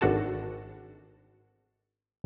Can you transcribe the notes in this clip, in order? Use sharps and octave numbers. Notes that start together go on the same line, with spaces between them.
G#1 D4 F#4 A4 A5